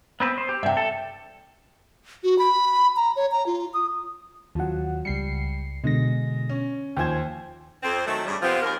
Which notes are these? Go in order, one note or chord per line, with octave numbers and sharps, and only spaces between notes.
B3 C4 B4
C5
G4
G2 C3 E5 G5
A4
F#4
B5
A#5
C#5
A#5
F4
D#6
D#2 F3 F#3 F#5
C#2 G3 C7 C#7
B2 D3 G#3 A#6
C#4
D#2 F3 C5 G5 G#5 G#6
F2 C4
D#3 F#3 A3
G2 C#3 G3
F2 C3 F3 B3 C4
D#2 A#4